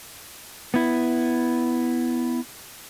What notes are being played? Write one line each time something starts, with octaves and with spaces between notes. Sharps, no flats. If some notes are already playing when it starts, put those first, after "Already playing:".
B3 E4